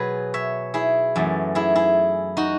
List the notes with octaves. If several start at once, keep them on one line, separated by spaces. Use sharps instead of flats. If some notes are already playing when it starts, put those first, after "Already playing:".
Already playing: B2 F#3 B3 G#4 B4
C#5 E5
E4 G#4
F#2 E3 A3
E4 G#4
E4 G#4
D#4 F#4